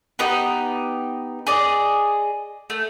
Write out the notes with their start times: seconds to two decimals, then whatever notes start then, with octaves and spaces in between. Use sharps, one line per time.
0.19 B3 D#4 G4
1.47 G#4 D5 D#5
2.70 A3